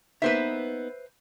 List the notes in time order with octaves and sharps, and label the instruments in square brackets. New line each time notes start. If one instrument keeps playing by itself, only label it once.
[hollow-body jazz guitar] A#3 B3 D#4 [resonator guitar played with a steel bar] B4 C5 E5